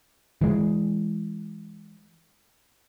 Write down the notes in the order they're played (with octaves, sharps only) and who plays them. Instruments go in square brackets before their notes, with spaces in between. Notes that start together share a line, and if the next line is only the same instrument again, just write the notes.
[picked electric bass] E3 G#3